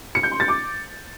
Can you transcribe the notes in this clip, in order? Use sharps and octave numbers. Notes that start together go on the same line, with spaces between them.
C#7
G6
C6
A6
D6